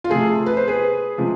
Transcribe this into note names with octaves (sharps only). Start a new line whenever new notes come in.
F4
C3 F3 A3 G#4
B4
C5
G#4 B4
C3 F3 G#3